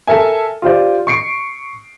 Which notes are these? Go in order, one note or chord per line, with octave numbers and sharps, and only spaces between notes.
A4 A#4 E5 G#5
F4 G4 C5 D5
C#6 C7 D7